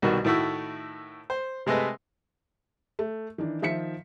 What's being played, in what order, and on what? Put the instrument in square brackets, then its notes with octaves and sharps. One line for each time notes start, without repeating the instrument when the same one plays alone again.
[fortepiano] C2 B2 D#3 F#4 A#4
A2 D#3 A3 E4 F#4
C5
C3 G#3 A3 B4 D#5
[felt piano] A3
D#3 E3 D4
D#3 F3 E5 B6 C#7